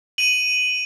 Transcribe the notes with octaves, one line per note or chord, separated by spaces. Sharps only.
D#7 F#7